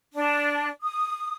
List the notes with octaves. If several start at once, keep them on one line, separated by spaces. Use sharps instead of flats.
D4
D#6